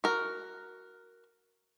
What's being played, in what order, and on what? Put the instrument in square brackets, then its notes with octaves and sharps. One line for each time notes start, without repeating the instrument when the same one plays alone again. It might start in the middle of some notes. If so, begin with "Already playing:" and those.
[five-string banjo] F#4 A#4